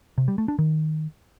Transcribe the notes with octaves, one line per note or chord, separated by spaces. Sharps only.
C3
G3
A3
D4
D#3